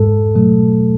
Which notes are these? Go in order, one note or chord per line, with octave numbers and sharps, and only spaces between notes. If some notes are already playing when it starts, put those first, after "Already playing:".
Already playing: G#2 G#3 A4
B2 F#3 A3